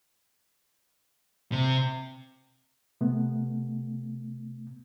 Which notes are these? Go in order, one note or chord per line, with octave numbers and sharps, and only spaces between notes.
C3
C3 A3 B3